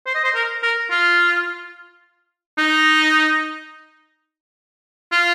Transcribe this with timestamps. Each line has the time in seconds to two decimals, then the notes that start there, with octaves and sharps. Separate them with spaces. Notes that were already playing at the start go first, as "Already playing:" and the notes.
0.06 C5
0.15 D#5
0.24 C5
0.35 A#4
0.63 A#4
0.91 F4
2.58 D#4
5.12 F4